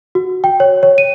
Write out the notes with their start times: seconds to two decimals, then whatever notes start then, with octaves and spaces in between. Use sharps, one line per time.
0.15 F#4
0.44 G5
0.60 C#5
0.83 C#5
0.98 D#7